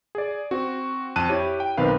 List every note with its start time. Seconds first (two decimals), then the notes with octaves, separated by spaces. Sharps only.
0.15 G#4 D5
0.51 C4 F#4
1.16 F2 A5 F#6 D#7
1.29 E4 G4 C#5
1.60 G5
1.77 B1 D#3 C4 B4 F5